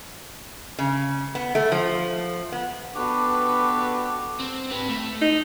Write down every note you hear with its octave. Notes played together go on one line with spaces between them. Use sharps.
C#3
B3
A3
F3
B3
B3 D4 F#4 G4 A4 B4
C4
G4 B4
A3
D#4